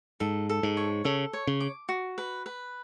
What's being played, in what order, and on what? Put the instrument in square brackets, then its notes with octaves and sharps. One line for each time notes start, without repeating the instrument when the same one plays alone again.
[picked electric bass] G#2 [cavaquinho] A4
[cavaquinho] A4
[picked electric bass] G#2
[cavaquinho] C#5
[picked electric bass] C#3 [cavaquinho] A4
[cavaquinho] C#5
[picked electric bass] C#3
[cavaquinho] D6
F#4
B4
B4